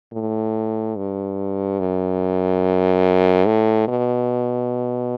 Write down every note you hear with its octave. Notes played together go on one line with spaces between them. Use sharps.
A2
G2
F#2
A2
B2